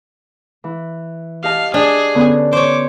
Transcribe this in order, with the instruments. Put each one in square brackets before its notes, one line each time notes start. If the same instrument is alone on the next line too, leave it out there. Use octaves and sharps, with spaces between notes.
[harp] E3
[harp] G4 D#5 A5 [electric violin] F5
[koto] D4 [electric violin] G#4
[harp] D3 B3 C#4
[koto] C5 C#5 [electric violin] D6